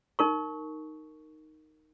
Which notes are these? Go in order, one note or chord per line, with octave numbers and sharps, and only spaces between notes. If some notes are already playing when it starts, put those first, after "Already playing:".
D#4 A#4 C#6